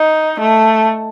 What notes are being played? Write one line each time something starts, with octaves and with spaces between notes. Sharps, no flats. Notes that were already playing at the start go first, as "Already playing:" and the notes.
Already playing: D#4
A3